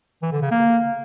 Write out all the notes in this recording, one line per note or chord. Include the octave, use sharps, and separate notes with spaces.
E3
D3
C#3
A#3